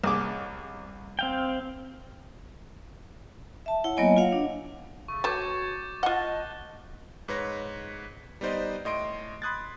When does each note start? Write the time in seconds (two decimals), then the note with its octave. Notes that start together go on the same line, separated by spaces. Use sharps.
0.04 C2 G#4 D6
1.19 C4 F5 G5
3.66 E5 A5
3.84 E4 C#5 F#5
3.97 F#3 A#3 B3 C#5 D#5 G#5
4.17 F4 C#5 F5 F#5
4.33 D4
5.08 C#3 A3 C#6
5.24 A3 F#4 B4 C#5 A5 D6 G6 A6
6.03 F4 D#5 F#5 A5 F#6 G7
7.28 G#2 B4 C#5 A#6
8.41 G3 B3 D#4 C5 D5 D#5
8.85 A2 D#5 C6 D7
9.42 B5 C6 D#6 F#6 G#6 A6